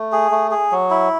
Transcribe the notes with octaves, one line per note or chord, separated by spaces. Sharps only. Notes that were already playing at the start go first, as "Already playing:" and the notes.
Already playing: A3
G#4
A3
G#4
F#3
E4